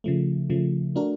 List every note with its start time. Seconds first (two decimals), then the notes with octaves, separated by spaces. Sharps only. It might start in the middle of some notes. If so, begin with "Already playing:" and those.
0.04 C#3 F3 A3
0.50 C#3 F3 A3
0.95 A3 D4 F#4 A#4